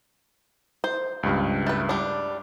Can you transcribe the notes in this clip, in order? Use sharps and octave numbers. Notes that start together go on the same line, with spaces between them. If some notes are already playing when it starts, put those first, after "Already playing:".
C5
C#2 G2
A3 B4
G3 D4